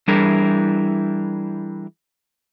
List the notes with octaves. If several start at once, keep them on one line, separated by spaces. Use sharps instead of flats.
E3 G3 D4 E4 G#4 A#4